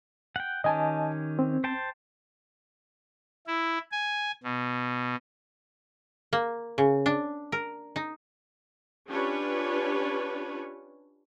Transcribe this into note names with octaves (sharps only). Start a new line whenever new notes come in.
F#5 G5
D#3 C#4 G4 D#5 G#5 A5
C4
C5 G5 A5
E4
G#5
B2
A#3
C#3
D4
A#4
D#4
C#4 D4 F4 G4 B4 C#5